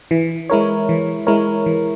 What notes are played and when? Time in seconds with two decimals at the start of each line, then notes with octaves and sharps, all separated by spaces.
0.11 E3
0.50 G#3 E4 A#4 C#5
0.89 E3
1.27 G#3 E4 A#4 C#5
1.66 E3